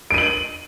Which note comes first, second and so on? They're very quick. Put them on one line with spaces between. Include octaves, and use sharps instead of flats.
D7 D#7 F#7